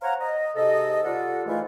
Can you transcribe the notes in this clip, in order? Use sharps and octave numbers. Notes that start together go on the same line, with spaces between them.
C5 C#5 F5 F#5 A#5
D#5
G#2 C3 A4 D#5
G3 F4 A4 D5 F#5
G#2 E3 A3 E4 F4